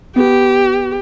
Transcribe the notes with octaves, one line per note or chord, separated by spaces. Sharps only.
B3 G4